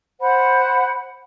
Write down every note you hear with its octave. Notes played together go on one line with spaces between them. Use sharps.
C5 F#5 B5